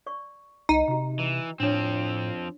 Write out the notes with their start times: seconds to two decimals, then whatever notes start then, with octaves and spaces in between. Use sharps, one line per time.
0.06 D5 C#6
0.69 C2 D#4
0.88 C3 F#4 A#5
1.19 E3
1.60 A2 F3 C4 D4 C#5